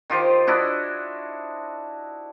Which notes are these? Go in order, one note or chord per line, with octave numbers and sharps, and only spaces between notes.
D#3 F4 G4 C5
D4 E4 F#4 D#5